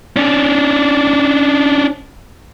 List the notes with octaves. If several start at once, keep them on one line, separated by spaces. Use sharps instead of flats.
C#4 D4